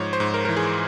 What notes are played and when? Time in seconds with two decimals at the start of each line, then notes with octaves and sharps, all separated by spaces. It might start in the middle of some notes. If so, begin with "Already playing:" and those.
Already playing: G#2 F3 C#5
0.13 C5
0.20 G#2
0.34 A#4
0.45 E3 A#4
0.56 G#4